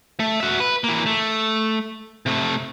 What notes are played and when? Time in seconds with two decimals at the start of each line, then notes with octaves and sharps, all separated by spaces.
0.20 A3
0.40 F#4 E5
0.60 B4
0.84 E3 A#3
1.06 A3
2.26 C3 A3